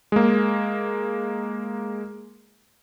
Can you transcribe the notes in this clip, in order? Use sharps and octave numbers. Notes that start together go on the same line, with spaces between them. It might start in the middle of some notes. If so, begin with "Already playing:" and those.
G#3 A#3